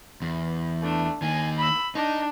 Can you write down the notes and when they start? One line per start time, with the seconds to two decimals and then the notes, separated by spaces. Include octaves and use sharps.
0.22 E2
0.82 A3 D4
1.22 D#3 A#3 G#5
1.58 B5 E6
1.95 D4 D#4